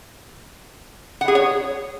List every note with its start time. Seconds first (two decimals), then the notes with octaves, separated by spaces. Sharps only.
1.21 F#5
1.28 G#4
1.35 C#5